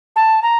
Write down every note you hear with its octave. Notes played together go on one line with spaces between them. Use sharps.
A5
A#5